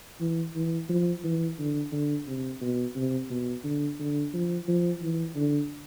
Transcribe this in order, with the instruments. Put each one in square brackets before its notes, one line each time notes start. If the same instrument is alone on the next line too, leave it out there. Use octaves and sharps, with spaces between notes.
[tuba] E3
E3
F3
E3
D3
D3
C3
B2
C3
B2
D3
D3
F3
F3
E3
D3